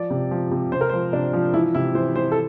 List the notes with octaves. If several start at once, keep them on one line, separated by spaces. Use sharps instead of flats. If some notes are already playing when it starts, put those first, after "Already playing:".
Already playing: F3 D5
C3
F3
C3
C3 C5
A#4
C5
F3
C3 D4
F3
E3 E4
C3 E4
E3 C5
E3 C5
A4